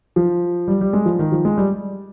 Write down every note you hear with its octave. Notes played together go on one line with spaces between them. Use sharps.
F3
G3
G3
G#3
F3
D#3
F3
G#3
G3